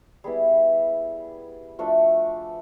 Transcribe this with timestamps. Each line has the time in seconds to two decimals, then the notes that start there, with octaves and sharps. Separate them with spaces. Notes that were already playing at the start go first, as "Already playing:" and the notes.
0.24 G3 B3 E4 G#4
1.79 F3 A3 D4 F#4